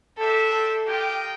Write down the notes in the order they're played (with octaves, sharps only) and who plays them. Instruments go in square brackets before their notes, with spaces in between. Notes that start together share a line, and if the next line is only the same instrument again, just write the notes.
[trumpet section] D4 G4 C5 E5 G5 [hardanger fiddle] A4
[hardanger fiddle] A4
[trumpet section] F4 A#4 D#5 G5 [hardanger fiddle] G4